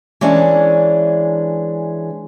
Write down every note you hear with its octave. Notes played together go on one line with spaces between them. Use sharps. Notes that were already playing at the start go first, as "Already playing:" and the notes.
E3 G#3 C#4 D4